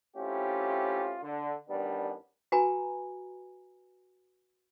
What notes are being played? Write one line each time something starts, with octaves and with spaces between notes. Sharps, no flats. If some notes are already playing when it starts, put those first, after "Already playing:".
A3 C4 C#4 E4 F4 G4
D3
A1 D#3 G3 B3 D4
F#4 B4 G#5 A#5 B5